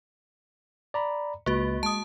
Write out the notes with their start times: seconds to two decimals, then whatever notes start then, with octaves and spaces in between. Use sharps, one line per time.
0.94 D5 A#5 B5
1.46 C#2 A#3 F#4 B4
1.83 G#3 A5 D#6